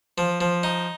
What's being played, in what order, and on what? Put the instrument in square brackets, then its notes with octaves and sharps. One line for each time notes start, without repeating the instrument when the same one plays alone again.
[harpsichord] F3
F3
D#4